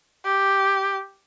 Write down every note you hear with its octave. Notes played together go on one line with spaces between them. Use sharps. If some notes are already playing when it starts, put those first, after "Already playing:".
G4